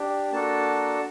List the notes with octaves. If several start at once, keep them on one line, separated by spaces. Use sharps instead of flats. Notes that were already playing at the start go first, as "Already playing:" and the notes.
Already playing: D4 G4
A#3 D4 F#4 A4 A5